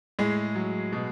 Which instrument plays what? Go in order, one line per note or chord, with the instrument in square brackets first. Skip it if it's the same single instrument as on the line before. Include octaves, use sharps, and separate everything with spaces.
[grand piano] A2 G#3 G#4
F#3
B2